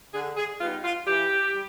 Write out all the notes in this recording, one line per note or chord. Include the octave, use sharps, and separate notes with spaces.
D3 G#4
G#4
G3 B3 D#4 F4
F4
E3 G4
G3